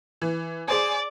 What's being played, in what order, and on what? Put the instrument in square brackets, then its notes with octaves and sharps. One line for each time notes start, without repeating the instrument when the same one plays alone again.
[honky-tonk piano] E3
[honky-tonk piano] G#4 C5 G#5 [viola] D5